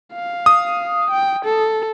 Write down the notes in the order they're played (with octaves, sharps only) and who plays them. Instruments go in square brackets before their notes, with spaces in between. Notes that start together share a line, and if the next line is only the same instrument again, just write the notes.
[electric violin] F5
[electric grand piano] D#6
[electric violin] G5
A4